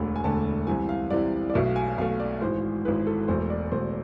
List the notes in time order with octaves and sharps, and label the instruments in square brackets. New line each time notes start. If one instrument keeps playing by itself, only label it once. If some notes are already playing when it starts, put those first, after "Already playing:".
Already playing: [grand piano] E1 D2 D3 A3 B5
G#5
E1 D2 D3 A3 A5
C2 C3 E3 G#5
F5
C2 C3 E3 D5
D5
B1 B2 A3 E5
F5
G#5
B1 B2 A3 F5
D5
G#1 G#2 E3 G#3 C5
G#1 G#2 E3 G#3 B4
A4
E1 E2 B2 A3 C5
D5
E1 E2 B2 A3 C5